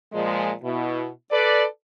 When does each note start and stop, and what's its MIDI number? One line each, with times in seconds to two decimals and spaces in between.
0.13 0.52 46
0.13 0.52 53
0.13 0.52 56
0.63 1.09 47
0.63 1.09 64
1.31 1.65 69
1.31 1.65 71
1.31 1.65 74